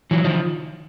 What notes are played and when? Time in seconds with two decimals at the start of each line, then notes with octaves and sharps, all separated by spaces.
0.11 E3 F#3
0.24 D#3 F3